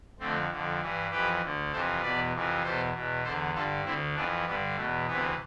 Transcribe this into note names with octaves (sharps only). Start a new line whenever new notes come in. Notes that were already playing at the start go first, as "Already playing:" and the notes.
F2 D3 A3 C4
F2 D3
G2 E3
F2 E3 G4 B4
D2 D3
F2 C3 E3 A4 C5
E2 B2 B4 D5
F2 C3 E3
E2 B2 A4 C5
E2 B2
E2 D3 A4 C5
G2 D3 F4 A4
D2 D3 C4 E4
F2 E3 B3 D4
G2 D3 B3
E2 B2 A3
D2 C3 E3 B3